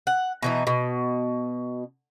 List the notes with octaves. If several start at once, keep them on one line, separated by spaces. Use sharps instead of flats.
F#5
B2 E3 D#4
B2